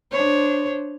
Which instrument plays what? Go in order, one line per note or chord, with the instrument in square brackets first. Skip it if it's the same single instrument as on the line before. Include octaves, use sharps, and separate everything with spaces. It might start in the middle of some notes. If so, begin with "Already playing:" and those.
[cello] D4 C5 [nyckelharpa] C#5